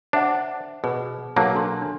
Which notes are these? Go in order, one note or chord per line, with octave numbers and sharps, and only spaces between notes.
D4 C5 E5 F#5
B2 G#4 B4
B1 F#3 A#3 A5
D4 A4 C6
D4